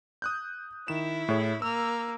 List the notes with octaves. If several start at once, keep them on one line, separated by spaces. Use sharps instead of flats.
D#6 F#6 G6
D#3 E4 E7
A2 G#4 C#5
A#3 E6